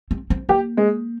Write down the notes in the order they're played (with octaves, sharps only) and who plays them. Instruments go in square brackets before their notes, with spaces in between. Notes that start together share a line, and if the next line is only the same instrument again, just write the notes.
[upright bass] C4
C4
[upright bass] A#3 [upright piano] G4
[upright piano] G#3